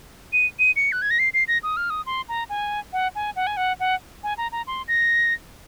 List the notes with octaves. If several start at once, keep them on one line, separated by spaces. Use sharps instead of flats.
D#7
D#7
C#7
F#6
G#6
A#6
C7
C7
A#6
D#6
F6
D#6
C6
A#5
G#5
F#5
G#5
F#5
G#5
F#5
F#5
G#5
A#5
A#5
C6
A#6